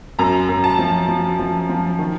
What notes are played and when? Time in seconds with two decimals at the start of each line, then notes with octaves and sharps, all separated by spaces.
0.19 F#2 A#5
0.49 F#2
0.64 A5
0.79 F3
1.09 F3
1.39 F3
1.69 F3
1.99 D#3